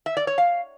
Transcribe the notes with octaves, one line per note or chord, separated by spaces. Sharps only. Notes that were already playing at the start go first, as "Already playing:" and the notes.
E5
D5
C#5
F5